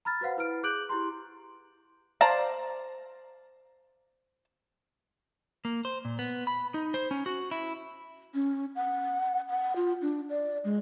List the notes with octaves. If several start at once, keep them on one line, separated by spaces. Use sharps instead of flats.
A#5 B5 F6 A6
F#4 B4 C5 F5 F#5
E4 B4 F6 D7
G#4 D6 F#6 G6 D7 F#7
E4 G4 A#5 C6
C5 D5 F5 A5 A#5
A#3
C5
A#2
B3
B5
D#4
C5
C#4
F#4
E4
C#4
F#5
F#5
F4
D4
D5
G#3